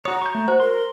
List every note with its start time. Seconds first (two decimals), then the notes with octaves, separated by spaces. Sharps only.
0.05 F#4 C#5 A#5 D#6
0.22 C#6 G6
0.35 A3
0.48 F#4 C5
0.60 A#4 C6